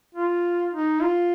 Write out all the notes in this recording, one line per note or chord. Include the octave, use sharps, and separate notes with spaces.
F4
D#4
F4